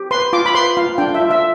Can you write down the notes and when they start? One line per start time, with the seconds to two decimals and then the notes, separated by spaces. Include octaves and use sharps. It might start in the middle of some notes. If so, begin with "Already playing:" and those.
Already playing: G4
0.11 B4 C6
0.33 F4 D6
0.46 B5
0.54 B4 C6
0.77 F4 F5
0.98 D4 G5
1.14 E5
1.20 F4
1.31 E5